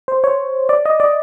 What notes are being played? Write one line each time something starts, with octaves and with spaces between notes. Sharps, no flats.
C5
C#5
D5
D#5
D5